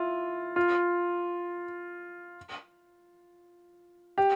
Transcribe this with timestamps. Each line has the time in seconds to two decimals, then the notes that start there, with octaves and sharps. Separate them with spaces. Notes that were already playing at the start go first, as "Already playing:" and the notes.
Already playing: E4 F4
0.56 F4
4.18 G4